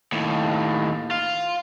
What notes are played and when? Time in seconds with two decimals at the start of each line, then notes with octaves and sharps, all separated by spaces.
0.12 D#2 A2
1.11 F4